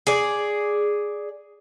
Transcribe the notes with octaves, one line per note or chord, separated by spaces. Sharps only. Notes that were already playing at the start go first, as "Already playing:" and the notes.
G#4 D5